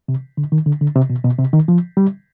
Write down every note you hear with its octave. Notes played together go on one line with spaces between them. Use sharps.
C3
D3
D#3
D3
D3
C3
B2
B2
C3
D#3
F3
G3